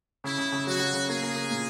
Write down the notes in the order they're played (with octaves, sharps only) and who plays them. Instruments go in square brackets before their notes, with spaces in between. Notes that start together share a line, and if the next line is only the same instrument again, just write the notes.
[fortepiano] C#3 [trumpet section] E4
[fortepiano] C#3
C#3
[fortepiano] F#3 [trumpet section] F#4
[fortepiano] F#3
C#3
[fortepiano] A#3 [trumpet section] G#4
[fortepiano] A#3
A#3
A#2